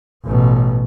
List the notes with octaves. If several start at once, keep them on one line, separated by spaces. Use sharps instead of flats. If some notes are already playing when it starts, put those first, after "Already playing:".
A1 B2